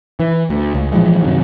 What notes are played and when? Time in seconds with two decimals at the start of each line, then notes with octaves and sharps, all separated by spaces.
0.20 E3
0.50 D2
0.74 C#2
0.93 A#2 E3 F3 G#3
1.21 F#2 C3 D#3 F#3